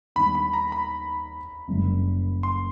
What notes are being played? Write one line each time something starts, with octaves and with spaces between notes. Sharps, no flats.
D#2 D#3 G3 B3 D4 B5
B5
A#5
B5
F#1 F#2 D3 G3
C6